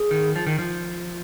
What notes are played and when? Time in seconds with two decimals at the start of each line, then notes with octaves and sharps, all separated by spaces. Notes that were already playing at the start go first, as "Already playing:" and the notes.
Already playing: G#4
0.11 D#3
0.36 F3
0.47 D#3
0.59 F3